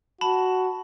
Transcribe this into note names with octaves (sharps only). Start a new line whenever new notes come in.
F#4 A5 B5